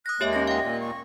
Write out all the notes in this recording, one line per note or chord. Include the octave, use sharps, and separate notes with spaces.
D#6 F#6 A#6
D#2 G#3 A#3 G4 C#5 E5
C#4 D#5 A#6
D#5 F5 G5
A#2
C#6